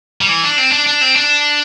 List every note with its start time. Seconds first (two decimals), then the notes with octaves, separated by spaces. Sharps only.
0.21 G3
0.29 E3
0.43 D4
0.58 C4
0.72 D4
0.87 D4
1.01 C4
1.16 D4